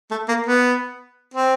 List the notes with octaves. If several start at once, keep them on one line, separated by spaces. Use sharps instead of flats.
A3
A#3
B3
C4